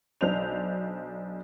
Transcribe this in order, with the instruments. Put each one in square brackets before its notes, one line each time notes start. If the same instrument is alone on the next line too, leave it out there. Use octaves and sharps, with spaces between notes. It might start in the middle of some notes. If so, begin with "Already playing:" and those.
[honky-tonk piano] B1 D4 C5 F7